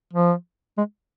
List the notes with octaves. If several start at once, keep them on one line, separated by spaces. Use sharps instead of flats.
F3
G#3